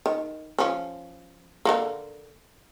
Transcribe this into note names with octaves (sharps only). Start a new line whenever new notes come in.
D#3
F3 C#4
D3 G3 A#3